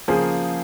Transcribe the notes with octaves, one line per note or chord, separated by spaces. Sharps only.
C#3 F3 A#3 G#4 C5